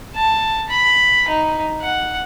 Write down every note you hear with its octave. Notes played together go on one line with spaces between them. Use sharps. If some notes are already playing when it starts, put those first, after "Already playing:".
A5
B5
D#4
F#5